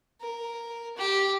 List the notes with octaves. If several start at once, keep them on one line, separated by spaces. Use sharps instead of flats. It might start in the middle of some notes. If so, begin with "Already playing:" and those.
A#4
G4